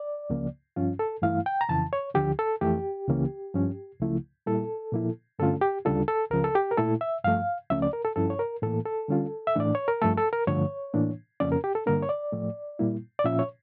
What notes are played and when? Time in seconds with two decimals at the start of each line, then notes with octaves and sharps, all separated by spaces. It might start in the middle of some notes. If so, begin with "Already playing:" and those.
Already playing: D5
0.30 C#2 C#3 F3 A#3
0.76 G2 F3 C#4 F4
0.99 A4
1.22 G2 E3 A3 E4 F5
1.46 G5
1.61 A#5
1.69 F2 C#3 E3 A5
1.93 C#5
2.15 D2 D3 F3 G4
2.39 A4
2.61 F2 E3 A3 G4
3.08 C#2 C#3 E3 A#3 C#4
3.54 G2 F3 C#4
4.01 C#2 C#3 F3 A3 E4
4.46 A#2 G3 A#3 E4 A4
4.92 A#2 F3 A#3 E4
5.38 G2 D3 A3 C#4 F4 A4
5.61 G4
5.85 D2 C#3 G3 D4 F4 A4
6.08 A4
6.31 C#2 C#3 F3 A#4
6.44 A4
6.55 G4
6.71 A#4
6.77 A#2 A3 E4 A4
7.01 E5
7.24 G2 F3 A3 F5
7.70 C#2 C#3 F3 A3 C#4 E5
7.82 D5
7.93 A#4
8.05 A4
8.16 G2 F3 C#4 E4 A4
8.30 C#5
8.39 A#4
8.62 A2 E3 A#3 A4
8.85 A4
9.08 D3 G3 C#4 F4
9.47 E5
9.56 A2 E3 A3 D4 D5
9.75 C#5
9.88 A#4
10.01 G2 F3 A3 A4
10.17 A4
10.33 A#4
10.47 G2 D3 F3 A3 C#5
10.94 A2 E3 A#3 D4
11.40 F2 C#3 F3 A#3 C#4 D5
11.52 A#4
11.64 G4
11.75 A4
11.86 G2 D3 G3 A#3 D4 A#4
12.03 C#5
12.09 D5
12.33 A2 F3 A3
12.79 A#2 G3 A#3 E4
13.19 D5
13.25 A#2 F3 C#4 F4 E5
13.39 C#5